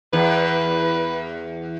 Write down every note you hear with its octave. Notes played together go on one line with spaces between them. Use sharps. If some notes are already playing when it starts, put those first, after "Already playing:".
E2 B4